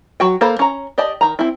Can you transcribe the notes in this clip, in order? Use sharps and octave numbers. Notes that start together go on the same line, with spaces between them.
F#3 F#4 G5
A#3 A4 C5 F5 B5
C#4 A#5
G4 D5 D#5 A5
D#3 A#5
C4 E4